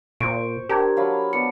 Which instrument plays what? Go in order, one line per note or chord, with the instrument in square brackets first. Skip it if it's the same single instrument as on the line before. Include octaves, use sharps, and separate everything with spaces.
[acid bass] A#2 [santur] C5 C#6 [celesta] D7
[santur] D4 [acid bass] G4 [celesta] A#4 A#5 G#6
[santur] F#3 F5 B5
[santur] B3 D5 [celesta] C#7